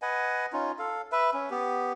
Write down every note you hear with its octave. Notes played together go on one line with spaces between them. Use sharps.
B4 D#5 F#5 G#5
C#4 D#4 F4
A4 F5
B4 E5
C#4
B3 G4